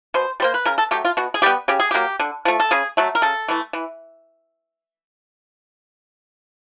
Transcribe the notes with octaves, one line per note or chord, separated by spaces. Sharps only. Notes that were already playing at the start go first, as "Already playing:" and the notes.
B2 C5
G3 A#3 C5
B4
C#3 A#4
A4
F#3 A3 G4
F4
B2 F#4
G#4
G3 B3 G4
C#3 G4
G#4
F#3 A#3 G4
D3
F3 A3
A4
C#3 G#4
F#3 A3
A#4
C#3 A4
E3 A3
E3